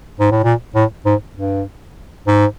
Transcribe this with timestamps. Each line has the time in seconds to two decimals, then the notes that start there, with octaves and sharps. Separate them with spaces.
0.20 G#2
0.32 A2
0.44 A#2
0.75 A2
1.06 G#2
1.35 G2
2.28 G#2